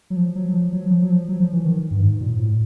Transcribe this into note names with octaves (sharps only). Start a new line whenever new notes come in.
F#3
F3
F#3
F3
F#3
F3
F#3
F3
F#3
F3
E3
D#3
G2
G#2
A#2
A2